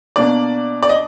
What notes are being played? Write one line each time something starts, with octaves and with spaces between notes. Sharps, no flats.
B2 A#3 D4 D5
D5
D#5